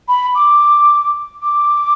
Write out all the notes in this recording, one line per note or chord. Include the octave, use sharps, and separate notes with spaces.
B5
D6
D6